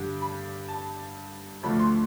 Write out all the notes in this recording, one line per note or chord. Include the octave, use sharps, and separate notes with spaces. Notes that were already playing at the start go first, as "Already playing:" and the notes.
Already playing: G2 D3 G3
B5
A5
D2 D3 F3 A3 B5
C6